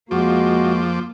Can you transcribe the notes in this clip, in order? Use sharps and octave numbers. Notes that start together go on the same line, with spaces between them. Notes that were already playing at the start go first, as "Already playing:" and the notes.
F2 F3 G#3 A#3 F#4 D6